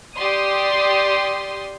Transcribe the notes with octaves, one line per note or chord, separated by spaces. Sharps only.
G4 D5 C6 D#6